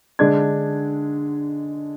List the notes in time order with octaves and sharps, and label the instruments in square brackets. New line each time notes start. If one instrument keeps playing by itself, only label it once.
[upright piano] D3 G#3 D4 G#6